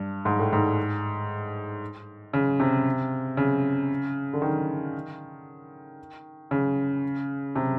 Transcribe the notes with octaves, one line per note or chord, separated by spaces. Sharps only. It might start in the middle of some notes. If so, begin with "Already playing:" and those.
Already playing: G2
G#2
A2
G#2
C#3
C3
C#3
D3
D#3
C#3
C3